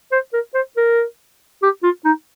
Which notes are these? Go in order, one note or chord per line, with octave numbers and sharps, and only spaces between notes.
C5
A#4
C5
A#4
G4
F4
D#4